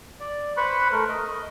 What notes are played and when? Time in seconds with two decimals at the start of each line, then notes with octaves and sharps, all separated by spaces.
0.20 D5
0.57 B4 C5 B5 C#6
0.92 A3 A#4
1.09 D#5